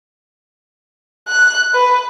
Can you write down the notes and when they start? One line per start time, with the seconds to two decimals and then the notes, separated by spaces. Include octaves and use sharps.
1.28 F#6
1.74 B4